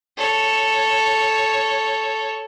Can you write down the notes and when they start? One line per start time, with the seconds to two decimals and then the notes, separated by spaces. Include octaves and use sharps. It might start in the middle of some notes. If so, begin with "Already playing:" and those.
0.17 A4 C#5